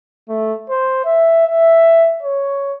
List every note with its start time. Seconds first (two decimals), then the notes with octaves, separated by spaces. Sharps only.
0.29 A3
0.69 C5
1.05 E5
1.47 E5
2.23 C#5